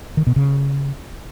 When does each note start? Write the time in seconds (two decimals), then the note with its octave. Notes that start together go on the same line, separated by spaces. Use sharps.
0.17 D#3
0.27 B2
0.36 C#3